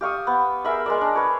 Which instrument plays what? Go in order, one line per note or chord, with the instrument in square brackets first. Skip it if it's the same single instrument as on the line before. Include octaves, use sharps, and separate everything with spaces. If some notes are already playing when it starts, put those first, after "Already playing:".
[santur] G4 F5 C#6 D#6
B3
G#4 A#4 E5 B5
G#3 A#4 D5
D4
B4 C#5